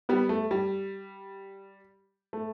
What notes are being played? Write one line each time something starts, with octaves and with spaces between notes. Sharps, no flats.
G3 B3
A3
G3
A3